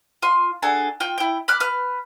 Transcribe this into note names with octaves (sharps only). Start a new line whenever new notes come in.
F4 C6
D4 F#4 G#4 A4
F4 G5
E4 G5
B5 D6 F6 F#6
B4 F6